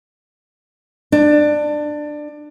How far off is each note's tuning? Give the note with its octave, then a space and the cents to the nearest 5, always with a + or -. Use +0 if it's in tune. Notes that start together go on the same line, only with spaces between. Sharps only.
D4 +20